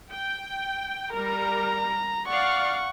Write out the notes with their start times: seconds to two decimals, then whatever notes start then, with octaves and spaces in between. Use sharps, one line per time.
0.12 G5
1.14 G3 A#4 A#5
2.28 D5 F5 F#5 C#6